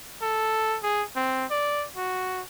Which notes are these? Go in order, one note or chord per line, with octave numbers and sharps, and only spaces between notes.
A4
G#4
C4
D5
F#4